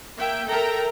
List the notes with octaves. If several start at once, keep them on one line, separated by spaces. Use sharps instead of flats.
A#3 E5 G5
A4 A#4 E5 G5 A#5